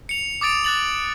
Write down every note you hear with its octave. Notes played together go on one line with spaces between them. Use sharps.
C#7 F7
D6 D#6 A6 D7 F7
F#6 A6 F#7